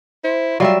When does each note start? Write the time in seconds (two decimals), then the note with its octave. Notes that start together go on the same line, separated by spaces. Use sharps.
0.24 E4 C5
0.60 F#3 G3 F4 D5 E5